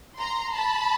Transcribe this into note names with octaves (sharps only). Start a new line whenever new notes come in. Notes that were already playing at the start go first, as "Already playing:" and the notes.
A#5 C6
A5 B5